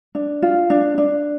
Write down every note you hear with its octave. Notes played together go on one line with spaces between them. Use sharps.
D4
F4
D4
D4